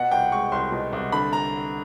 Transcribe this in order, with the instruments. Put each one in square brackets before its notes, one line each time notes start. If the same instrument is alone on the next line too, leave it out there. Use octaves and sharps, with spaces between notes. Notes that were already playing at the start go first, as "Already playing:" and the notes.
Already playing: [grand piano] B2 F#5
C2 G5
G#3 C#6
C2 C6
B2
C2
D3 B5
A#5